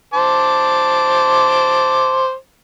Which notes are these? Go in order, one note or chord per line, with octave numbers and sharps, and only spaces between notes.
C5 A5 D6